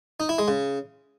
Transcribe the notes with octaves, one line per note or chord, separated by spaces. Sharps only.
D#4
E4
G#3
C#3